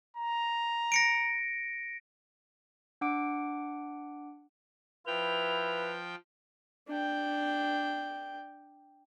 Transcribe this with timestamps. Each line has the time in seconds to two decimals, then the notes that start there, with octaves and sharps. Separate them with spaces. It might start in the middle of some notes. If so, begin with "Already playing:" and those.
0.17 A#5
0.92 A#6 C#7 D7
3.01 D4 F#5 D6 D7
5.07 F3 E4 B4 G5 F7
6.88 D4 G5